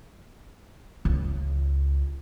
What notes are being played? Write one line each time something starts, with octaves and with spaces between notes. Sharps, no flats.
C#2